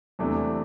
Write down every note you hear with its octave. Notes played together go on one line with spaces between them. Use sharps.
E2 C3 E3 A3 D4